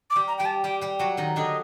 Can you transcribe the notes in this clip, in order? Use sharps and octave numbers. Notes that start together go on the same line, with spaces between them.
D6
G3 G4
A#5
G3 G4 G5
A5
G3 G4 G5
G3 G4
F#3 F#4
D#3 D#4
D3 D4 D#5